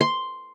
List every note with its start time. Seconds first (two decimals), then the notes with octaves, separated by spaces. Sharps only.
0.01 C6